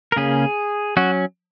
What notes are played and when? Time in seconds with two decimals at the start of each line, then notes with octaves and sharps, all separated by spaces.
0.12 A#4
0.16 C#3 A#3 C#4 G#4
0.97 F#3 C#4 F#4